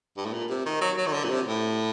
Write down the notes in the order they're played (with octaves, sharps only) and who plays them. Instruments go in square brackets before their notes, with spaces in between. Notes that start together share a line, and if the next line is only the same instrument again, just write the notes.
[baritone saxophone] G2
A2
A#2
C3
D#3
F#3
F#3
D#3
D3
A#2
C3
A2